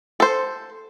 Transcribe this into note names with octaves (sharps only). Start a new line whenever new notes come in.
A4 C5